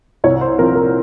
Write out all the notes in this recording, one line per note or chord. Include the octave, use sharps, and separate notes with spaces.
C2 C#5
C5
A#2 F3 C4 F4 A#4
A#4